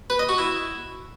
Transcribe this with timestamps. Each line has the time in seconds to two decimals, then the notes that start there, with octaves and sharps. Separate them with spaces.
0.10 B4
0.19 D#5
0.29 F#4
0.38 E4